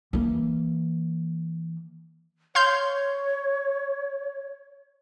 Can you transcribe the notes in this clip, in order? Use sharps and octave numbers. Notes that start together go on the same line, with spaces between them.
E3 A#3
C#5 F5 C6 G6